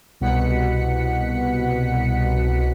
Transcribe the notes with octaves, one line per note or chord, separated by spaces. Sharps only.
C2 B2 F#5 B6 C#7